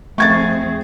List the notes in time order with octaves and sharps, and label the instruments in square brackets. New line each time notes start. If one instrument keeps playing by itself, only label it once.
[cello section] F2 C4 G#4 [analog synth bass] A3 [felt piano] C#6 G#6 A6